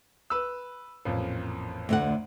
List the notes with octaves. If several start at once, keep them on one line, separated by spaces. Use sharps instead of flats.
B4 E6
A1 F2 A#2
D2 D3 F#5